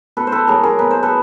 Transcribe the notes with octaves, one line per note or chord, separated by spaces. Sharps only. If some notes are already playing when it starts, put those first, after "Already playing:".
B2 A4 B4
C5
A4 B4
F#3 A#3 G#4 A#4
G#4 A#4
B2 B4
C5
A4 B4